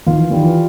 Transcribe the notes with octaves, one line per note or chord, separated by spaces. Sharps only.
D#3 F4
E3
D#3 G3
E3